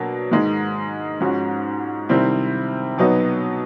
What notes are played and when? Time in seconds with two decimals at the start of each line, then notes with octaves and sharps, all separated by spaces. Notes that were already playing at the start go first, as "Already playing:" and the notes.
Already playing: B2 F#3 A#3 D4
0.31 G#2 D#3 G#3
1.20 G#2 F3 G#3 C#4 F#4
2.09 C3 D#3 G3 C4 E4
2.98 B2 F#3 B3 D#4